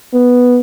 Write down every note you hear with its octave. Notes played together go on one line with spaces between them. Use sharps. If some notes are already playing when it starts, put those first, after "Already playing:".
B3